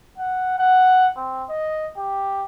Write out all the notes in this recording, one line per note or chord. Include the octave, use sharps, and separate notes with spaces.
F#5
F#5
C4
D#5
G4